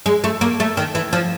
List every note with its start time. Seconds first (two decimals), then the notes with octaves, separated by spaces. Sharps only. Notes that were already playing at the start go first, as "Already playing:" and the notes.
0.06 G#3
0.24 A3
0.41 A#3
0.60 A3
0.77 D#3
0.95 E3
1.13 F3